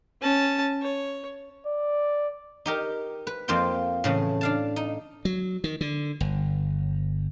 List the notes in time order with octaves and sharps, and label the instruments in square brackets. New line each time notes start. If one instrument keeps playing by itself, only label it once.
[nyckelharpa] C#4 A5
C#5
[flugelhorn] D5
[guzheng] D#4 G4 A#4
B4
F2 A#3 F4 C5 G5
A2 C#3 E3
D4 F5 A5
D#4
[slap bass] F#3
D#3
D3
G1